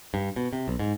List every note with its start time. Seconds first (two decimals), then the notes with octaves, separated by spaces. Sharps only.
0.14 G2
0.36 B2
0.53 C3
0.68 B1
0.79 G#2